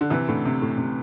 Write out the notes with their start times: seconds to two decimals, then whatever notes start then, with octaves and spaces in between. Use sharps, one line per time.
0.01 D3
0.10 C3 E3
0.28 A2 D3
0.45 C3
0.62 A2
0.78 C3